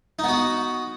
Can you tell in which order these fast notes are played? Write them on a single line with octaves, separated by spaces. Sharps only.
D#4 B3 F#4